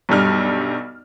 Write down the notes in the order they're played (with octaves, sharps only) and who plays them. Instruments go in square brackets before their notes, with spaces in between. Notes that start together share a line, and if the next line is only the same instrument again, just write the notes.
[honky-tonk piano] B1 G2 G3 F6